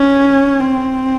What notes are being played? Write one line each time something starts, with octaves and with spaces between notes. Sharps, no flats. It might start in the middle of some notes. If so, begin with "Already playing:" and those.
Already playing: C#4
C4